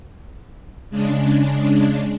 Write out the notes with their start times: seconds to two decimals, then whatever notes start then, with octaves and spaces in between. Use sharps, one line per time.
0.90 C#3 G#3 D4